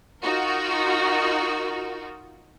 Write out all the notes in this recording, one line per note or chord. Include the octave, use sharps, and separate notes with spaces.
D#4 F4 F#4 A#4